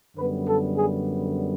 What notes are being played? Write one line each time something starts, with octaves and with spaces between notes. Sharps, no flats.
F#2 D3 G3 B3 B4
A4
G#4